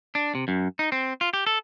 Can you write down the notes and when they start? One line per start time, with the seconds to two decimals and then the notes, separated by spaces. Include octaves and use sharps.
0.15 D4
0.35 C3
0.48 F#2
0.79 D#4
0.92 C4
1.21 F4
1.34 G4
1.47 A4